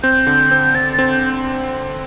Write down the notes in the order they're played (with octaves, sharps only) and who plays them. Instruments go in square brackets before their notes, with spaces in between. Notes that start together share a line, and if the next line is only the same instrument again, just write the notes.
[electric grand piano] C4 [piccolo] G6
[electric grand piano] D3
C4
[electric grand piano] C4 [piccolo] A6
[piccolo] A6
[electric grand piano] C4
[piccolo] G6